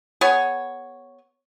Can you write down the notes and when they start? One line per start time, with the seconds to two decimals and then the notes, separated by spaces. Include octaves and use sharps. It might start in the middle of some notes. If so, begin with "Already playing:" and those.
0.21 B3 G#4 C#5